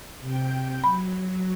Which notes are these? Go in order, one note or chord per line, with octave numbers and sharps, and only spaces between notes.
C3 G5 G6
F#3 B5